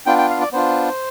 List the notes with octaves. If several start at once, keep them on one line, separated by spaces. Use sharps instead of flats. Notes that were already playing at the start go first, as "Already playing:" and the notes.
B3 D4 F4 G5
G5
F5
D5
B3 D4 F4 C5